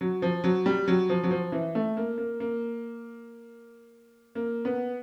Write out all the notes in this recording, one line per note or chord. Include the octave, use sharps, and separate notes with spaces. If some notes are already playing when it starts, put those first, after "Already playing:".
F#3
F3
F#3
G3
F#3
F3
F#3
F3
E3
A3
A#3
A#3
A#3
A#3
B3